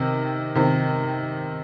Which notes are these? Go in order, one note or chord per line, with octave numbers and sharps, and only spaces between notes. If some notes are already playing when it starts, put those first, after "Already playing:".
Already playing: C3 D#3
C3 D#3